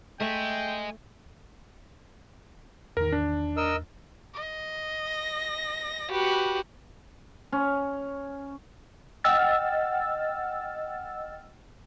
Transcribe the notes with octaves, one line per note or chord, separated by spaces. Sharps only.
A3 D#5 E5 G5 G#5
E2 A2 D#3 A#4
D4
A#4 D#5 E6
D#5
A#6
F#4 G4 B4
C#4
D#5 F#5 G5 E6 F6 A6